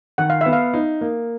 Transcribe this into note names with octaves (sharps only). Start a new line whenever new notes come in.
D#3 F#5
F5
B3 E5
F5
D#4
A#3